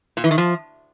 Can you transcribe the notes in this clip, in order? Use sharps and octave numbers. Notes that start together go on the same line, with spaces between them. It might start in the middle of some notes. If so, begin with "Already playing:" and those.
A#2
E3
D#3
F3